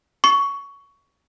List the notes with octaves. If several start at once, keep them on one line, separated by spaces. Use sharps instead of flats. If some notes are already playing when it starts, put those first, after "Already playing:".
C#6